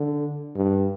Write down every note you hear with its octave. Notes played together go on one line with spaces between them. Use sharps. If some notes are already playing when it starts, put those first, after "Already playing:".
Already playing: D3
G2